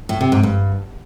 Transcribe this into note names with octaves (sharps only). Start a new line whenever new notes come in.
A2
C3
G#2
G2